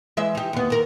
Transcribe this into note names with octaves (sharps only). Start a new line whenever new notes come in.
E3 G#3 E5
D#4 G4
D#2 B3
D#2 A#4